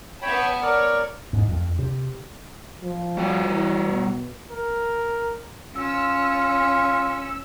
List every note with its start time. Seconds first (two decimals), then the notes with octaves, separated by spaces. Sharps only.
0.22 B3 C#5 E5 G5 A5 B5
0.62 A#4 C#5 D5
1.33 G#2
1.48 F2
1.79 C3
2.81 F3
3.17 G3 F#4 G5
3.48 E3
3.88 B2
4.51 A#4
5.76 C#4 F4 E6